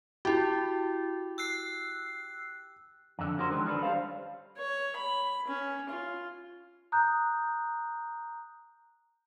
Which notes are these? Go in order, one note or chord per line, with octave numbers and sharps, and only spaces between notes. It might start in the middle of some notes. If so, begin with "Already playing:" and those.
E4 F#4 G4
E6 F#6 C7
F2 D3
C#4 F#4 A#4 C5
D3 D#3 F3 F#3 G#3
C#4 D4 A4 B4
G3 A4 C5 F5
C#5
B5
C#4
F4
A#5 D#6 F#6 G6